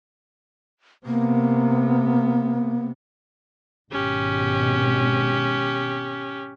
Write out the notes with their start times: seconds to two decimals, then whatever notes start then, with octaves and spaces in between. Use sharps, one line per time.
1.06 C3 A#3 B3
3.92 G#1 B2 C#4 G4